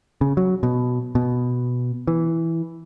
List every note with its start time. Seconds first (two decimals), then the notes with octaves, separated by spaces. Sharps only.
0.21 C#3
0.37 F#3
0.63 B2
1.15 B2
2.07 E3